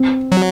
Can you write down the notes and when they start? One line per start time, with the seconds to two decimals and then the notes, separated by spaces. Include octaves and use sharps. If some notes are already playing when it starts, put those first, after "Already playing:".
Already playing: C4
0.32 F#3